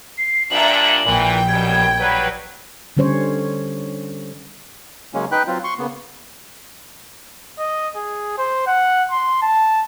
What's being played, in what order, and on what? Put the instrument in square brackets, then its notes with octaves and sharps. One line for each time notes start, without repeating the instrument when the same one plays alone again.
[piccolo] C7
[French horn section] G2 A#2 D4 [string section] E5 A#5 [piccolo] F#7
[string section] A#1 G5 [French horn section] A#2 E3
[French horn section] F#2 B2 G3 [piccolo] G#6
[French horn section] F#3 G3 B4
[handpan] D3 G3 C#4 C5 C#5
[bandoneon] C#3 F#3 G#3 A#3 C#4
D#4 B4 G5 B5 F#6
F#3 C4 F4
C6 C#6
C#3 A#3 B3
[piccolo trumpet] D#5
G#4
C5
F#5
C6
A5